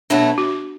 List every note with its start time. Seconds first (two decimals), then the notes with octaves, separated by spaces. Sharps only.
0.10 B2 F#3 A3 D4 E4
0.38 F#4